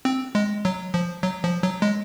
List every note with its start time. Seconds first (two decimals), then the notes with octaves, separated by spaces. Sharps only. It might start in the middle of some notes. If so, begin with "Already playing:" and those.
0.05 C4
0.35 G#3
0.65 F#3
0.94 F3
1.23 F#3
1.44 F3
1.63 F#3
1.82 G#3